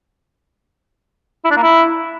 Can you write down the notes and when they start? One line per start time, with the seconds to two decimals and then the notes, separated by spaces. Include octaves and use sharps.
1.45 E4
1.51 D4
1.57 A#3
1.63 E4